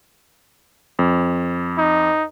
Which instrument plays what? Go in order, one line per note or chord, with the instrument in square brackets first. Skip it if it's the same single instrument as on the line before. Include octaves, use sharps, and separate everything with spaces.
[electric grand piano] F2
[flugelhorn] D#4